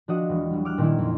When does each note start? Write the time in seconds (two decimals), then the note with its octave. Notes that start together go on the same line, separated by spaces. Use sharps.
0.08 F3 D4 F#4 D#5
0.29 E1
0.50 F#3 G3
0.65 D6 F6 F#6
0.78 A#2 D#3 A#3 E4
0.99 F2